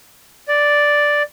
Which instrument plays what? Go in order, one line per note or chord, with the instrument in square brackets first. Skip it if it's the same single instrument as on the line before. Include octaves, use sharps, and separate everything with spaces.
[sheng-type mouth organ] D5